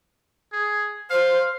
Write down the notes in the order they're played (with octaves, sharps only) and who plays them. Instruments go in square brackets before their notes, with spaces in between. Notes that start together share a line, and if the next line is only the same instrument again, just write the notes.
[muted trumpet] G#4
[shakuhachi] C5 [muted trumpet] F5